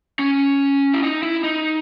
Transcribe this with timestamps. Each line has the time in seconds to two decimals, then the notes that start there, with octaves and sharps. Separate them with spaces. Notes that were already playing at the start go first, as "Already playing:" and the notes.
0.19 C#4
0.93 E4
1.02 D#4
1.23 E4
1.44 D#4